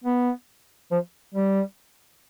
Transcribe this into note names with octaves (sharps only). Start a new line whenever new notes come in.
B3
F3
G3